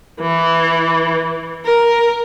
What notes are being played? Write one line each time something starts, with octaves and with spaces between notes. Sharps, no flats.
E3
A#4